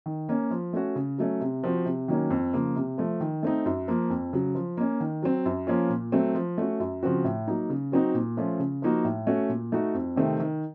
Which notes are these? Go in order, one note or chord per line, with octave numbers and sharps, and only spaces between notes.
D#3
A#3 C#4
F3
A3 C#4 F#4
C#3
F#3 A3 C#4
C3
F3 C4 F#4
C3
D#3 F#3 A#3 C#4
F2
C#3 F3 A#3
C3
F3 A3
D#3
A3 C4 D#4
F#2
F3 A#3
F2
C#3 F#3
F3
A#3 C#4
D#3
F#3 C4
F#2
F3 A#3 C#4 F4
A#2
F#3 A3 C4
F3
A3 C#4 F#4
F#2
C#3 F3 C4 F#4
A2
F#3 A#3 D#4
C#3
F#3 C4 D#4 F#4
A#2
F3 A3 C#4 F4
C#3
F3 A#3 D#4 F#4
A2
A3 C#4 F#4
A#2
A3 D#4 F#4
F2
C3 D#3 A3 C4
D#3